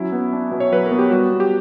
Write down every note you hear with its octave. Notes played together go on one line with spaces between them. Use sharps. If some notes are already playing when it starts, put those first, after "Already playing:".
Already playing: F#3 C#4 E4
B3
D4
B2
C#5
F#3 B4
A#4
B3
G4
G3 F#4
B3
G4